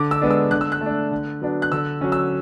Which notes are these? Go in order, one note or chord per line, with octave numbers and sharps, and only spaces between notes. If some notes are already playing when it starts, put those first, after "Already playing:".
Already playing: D3 D6
E6
G#3 B3 D4
E6
D3 F#6
E6
F#6
A3
D4
D3
F#3 B3 D4
F#6
D3 E6
F#3 C#4
E6